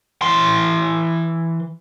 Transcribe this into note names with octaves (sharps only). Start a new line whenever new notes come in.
E3 C6